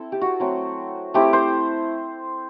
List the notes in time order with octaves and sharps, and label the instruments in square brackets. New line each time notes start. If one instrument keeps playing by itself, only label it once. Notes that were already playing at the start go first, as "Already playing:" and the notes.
Already playing: [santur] C4 E4 A4
G4
F#4
F#3 A3 C4
A3 C4 E4 G4
C5